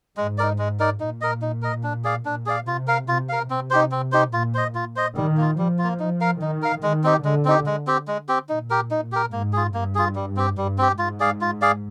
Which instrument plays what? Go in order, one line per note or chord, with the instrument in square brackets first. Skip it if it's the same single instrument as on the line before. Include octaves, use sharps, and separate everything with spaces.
[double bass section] G#2 [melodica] G#3
[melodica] D#4 A#4 D5
G#3
D#4 A#4 D5
[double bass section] A#2 [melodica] D#4
[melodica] A#4 D#5
D#4
A#4 D#5
D4
G#4 D5 F5
[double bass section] A#2 [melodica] D4
[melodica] G#4 D5 F5
[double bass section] C3 [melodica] F4
[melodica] A#4 F5
[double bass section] C3 [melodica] F4
[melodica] A#4 F5
[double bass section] C3 [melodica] C4
[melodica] D#4 G4 C5
C4
D#4 G4 C5
[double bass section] A#2 [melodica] F4
[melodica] C5 D#5
F4
C5 D#5
[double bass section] D#3 [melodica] G3
[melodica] A#3 F4
[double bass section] F3 [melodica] G3
[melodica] F4
A#3
D#4
A#4 F5
[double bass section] D#3 [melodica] D#4
[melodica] A#4 F5
[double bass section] D#3 [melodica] G#3
[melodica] C4 D#4 G4
[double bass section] D3 [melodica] G#3
[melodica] C4 D#4 G4
G#3
C4 G4
G#3
C4 G4
[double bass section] A#2 [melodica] D#4
[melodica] G4 A#4
D#4
G4 A#4
[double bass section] G#2 [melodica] A#3
[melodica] F4 G#4
[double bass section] G2 [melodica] A#3
[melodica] F4 G#4
G3
C4 G4
[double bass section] G2 [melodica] G3
[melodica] C4 G4
[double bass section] G#2 [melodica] F4
[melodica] G#4 D5 F5
F4
G#4 D5 F5